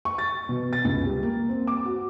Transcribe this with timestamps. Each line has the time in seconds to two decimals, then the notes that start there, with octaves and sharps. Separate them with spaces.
0.05 C#6
0.18 A6
0.49 B2
0.73 A6
0.85 C#2
1.06 G3
1.23 A#3
1.49 C4
1.67 D6
1.85 F#4